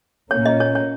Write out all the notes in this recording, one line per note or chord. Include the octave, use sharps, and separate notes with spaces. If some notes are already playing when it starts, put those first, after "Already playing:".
A#2 A#3 C#4 C#5
D#5
C#5
C#5